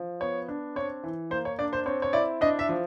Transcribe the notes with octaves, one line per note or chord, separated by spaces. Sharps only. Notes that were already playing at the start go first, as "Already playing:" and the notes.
Already playing: F3
B3 C#5
D4
C4 C#5
E3
A#3 C5
C#5
D4 D5
C5
C4 C#5
C#5
E4 D5
D4 D#5
E5
F3